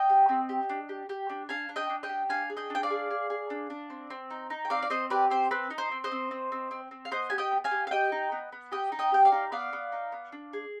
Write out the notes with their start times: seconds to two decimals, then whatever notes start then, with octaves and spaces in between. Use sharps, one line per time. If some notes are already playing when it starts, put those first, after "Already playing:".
Already playing: D#5 G5
0.10 G4
0.29 C4
0.49 G4
0.69 D4
0.89 G4
1.09 G4
1.30 D4
1.49 D4 F5 G#5
1.69 D4
1.76 D#5 G5
1.90 D4
2.03 D#5 G5
2.09 G4
2.29 D4 F5 G#5
2.50 G#4
2.57 D#5 G5
2.70 D4 G5
2.83 D5 F5
2.90 G#4
3.10 G#4
3.30 G#4
3.50 D4
3.70 D4
3.90 C4
4.10 C4
4.30 D#4
4.50 D#4
4.65 G5
4.70 C4 D5 F5
4.82 D5
4.90 C4 C5 D#5
5.10 G4 B4 D5
5.30 C4 C5
5.51 C4 B4
5.70 D#4
5.78 C5
5.91 C4
6.04 C5 D#5
6.11 C4
6.31 C4
6.52 C4
6.71 C4
6.91 C4
7.05 F5
7.11 B3 C5 D#5
7.30 G4 G#5
7.38 D#5 G5
7.51 B3
7.64 F5 G#5
7.71 G4
7.87 F5
7.91 G4 D#5 G5
8.12 D#4
8.32 B3
8.52 B3
8.72 G4 D#5 G5
8.92 D#4
8.99 D#5 G5
9.12 G4 G5
9.25 D5 F5
9.32 D#4
9.52 B3 D5 F5
9.73 B3
9.92 D#4
10.12 B3
10.32 D4
10.53 G#4